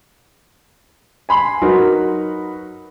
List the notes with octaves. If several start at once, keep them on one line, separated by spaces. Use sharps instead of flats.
G#5 B5 C6
F#3 D#4 F#4 A#4 B4